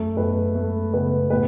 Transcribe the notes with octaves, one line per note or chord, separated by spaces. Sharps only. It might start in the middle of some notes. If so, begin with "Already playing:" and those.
Already playing: F#2 A3 A4
F#2 B3 B4
G#3 A3 A4
C#3 B3 B4
A2 B3 B4